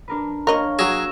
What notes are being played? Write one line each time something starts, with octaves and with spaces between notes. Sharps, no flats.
D4 A#4 B4
A#3 A#4 C#5 D#5 F5 C#6
F#3 G#4 E6 A#6 E7